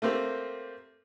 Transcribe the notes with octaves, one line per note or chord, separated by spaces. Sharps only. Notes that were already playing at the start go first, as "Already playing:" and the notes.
A3 A#3 C4 G4